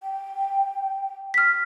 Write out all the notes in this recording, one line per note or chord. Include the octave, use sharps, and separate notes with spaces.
G5
F6 B6